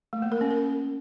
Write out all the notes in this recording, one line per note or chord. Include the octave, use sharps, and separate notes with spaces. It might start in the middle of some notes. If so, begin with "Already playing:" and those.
A3
A#3
A#4
C#4
A#4